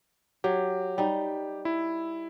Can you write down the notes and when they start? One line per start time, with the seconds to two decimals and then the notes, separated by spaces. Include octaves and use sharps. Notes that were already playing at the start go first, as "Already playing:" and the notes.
0.44 F#3 G4
0.98 G3 D#4
1.65 E4